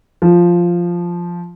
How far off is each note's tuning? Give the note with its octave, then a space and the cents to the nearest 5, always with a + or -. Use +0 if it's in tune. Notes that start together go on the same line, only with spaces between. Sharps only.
F3 +0